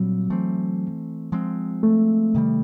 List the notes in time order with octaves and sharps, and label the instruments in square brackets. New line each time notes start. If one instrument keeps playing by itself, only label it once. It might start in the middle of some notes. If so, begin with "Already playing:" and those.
Already playing: [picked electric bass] A#2 G3 C4 [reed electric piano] F#3
[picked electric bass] E3 A3 C4
F3 G#3 C4
[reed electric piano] A3
[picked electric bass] C3 D#3 G3